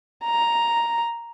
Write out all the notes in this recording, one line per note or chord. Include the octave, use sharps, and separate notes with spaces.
A#5